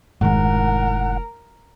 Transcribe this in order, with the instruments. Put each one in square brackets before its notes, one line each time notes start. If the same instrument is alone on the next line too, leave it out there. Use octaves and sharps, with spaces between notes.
[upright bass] F1 E4 [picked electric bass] G#2 D#3 G#3 [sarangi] A#4 [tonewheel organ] F#5